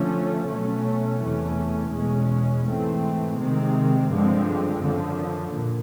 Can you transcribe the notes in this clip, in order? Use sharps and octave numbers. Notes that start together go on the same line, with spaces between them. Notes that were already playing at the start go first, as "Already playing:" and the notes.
Already playing: D3 F3 A3 C#4
B2 F#3 A3 C#4
E2 C3 E3 A3 C#4
E2 B2 G#3 C#4
G#2 E3 A3 C4
C3 D#3 G#3 C4
G2 D3 F3 G#3 C4
F#2 D3 F3
A#2